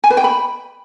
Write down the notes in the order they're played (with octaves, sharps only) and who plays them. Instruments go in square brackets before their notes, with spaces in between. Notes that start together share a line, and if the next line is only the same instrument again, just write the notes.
[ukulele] G#5
B4
G5
B5